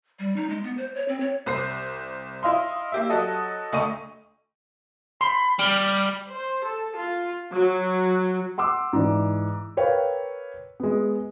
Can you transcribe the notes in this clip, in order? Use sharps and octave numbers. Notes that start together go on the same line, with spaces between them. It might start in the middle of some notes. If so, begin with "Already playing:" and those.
G3
D#4
G#3
B3
C5
C#5
C4
C#5
C2 C5 C7
E4 D#5 F5 C6
A#3 G4 E5
F#3 F#4 A4 D#5
D2 A3 D#5 C#6 D#7
B5 C6
G3 F6
C5
A4
F4
F#3
F#5 C6 D6 E6
G#2 E3 D5
A#4 B4 C#5 F5 G5
G#3 B3